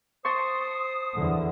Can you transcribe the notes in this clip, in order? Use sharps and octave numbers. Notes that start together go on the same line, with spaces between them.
C5 A5 C6 C#6 D#6
E2 D3